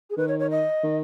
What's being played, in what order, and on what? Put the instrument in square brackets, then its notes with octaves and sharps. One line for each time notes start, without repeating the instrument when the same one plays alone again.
[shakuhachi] G#4
[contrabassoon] D#3 [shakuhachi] B4
[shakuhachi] C#5
C#5
D#5
[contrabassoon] D#3